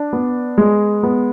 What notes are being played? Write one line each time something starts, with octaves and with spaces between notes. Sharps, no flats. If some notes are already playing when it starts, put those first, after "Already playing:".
Already playing: D4
B3
G#3
B3